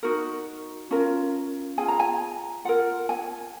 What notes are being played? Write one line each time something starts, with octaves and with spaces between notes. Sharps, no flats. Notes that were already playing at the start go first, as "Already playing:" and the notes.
D#4 F#4 A#4
C#4 F4 A#4
F4 G#4 G#5
A#5
G#5
F4 A#4 F#5
G#5